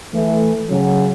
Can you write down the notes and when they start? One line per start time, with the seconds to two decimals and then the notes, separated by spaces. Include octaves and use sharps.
0.14 E3 A3
0.70 C#3 F#3